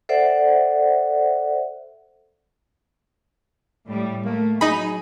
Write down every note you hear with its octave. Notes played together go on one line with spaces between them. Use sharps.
A4 C5 D5 E5 F#5
A2 G3
A3 A#3
F#3 D#4 G#4 B5